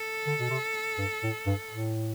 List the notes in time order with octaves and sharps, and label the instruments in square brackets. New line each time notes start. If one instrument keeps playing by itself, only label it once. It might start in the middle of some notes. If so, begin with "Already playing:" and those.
Already playing: [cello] A4
[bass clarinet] D3
B2
C3
G2
A2
G2
A2